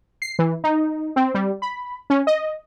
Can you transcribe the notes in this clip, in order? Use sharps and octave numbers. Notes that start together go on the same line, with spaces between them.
C7
E3
D#4
C4
G3
B5
C#4
D#5